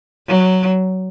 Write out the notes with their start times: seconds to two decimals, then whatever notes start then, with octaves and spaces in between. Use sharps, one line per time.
0.28 F#3